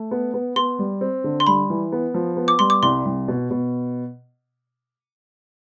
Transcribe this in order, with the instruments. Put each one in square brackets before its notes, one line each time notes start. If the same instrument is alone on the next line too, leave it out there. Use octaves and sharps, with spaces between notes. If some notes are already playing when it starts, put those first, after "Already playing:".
Already playing: [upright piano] A3
B3
B3
[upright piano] B3 [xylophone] C6
[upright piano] G3
C4
D3
[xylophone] C6
[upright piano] G3 [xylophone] B5
[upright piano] E3
B3
F3
B3
[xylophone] D6
[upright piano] G3 [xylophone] C6
[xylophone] D6
[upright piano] C2 [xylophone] C6
[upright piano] C2
B2
B2